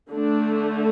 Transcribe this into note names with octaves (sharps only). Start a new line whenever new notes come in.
D3 A3 D4